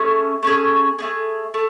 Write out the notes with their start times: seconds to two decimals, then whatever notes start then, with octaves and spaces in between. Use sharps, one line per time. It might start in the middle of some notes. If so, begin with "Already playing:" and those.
Already playing: A3 C#4 G#4
0.43 A3 C#4 G#4
0.99 A3 C#4 G#4
1.54 A3